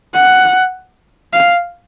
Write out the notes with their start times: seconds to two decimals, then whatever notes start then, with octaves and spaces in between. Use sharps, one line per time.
0.15 F#5
1.33 F5